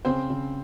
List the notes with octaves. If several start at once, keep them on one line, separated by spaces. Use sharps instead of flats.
C#3 C4 C5
C#3